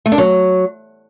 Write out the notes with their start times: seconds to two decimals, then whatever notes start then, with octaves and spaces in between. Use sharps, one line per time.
0.06 A3
0.12 D4
0.18 F#3